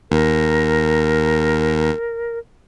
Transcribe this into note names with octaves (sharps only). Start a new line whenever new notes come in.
D#2 A#4